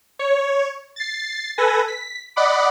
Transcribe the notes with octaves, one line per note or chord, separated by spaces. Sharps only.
C#5
A6 C7
A4 B4 G#5 A#6
B6
D5 D#5 F#5 B5 D6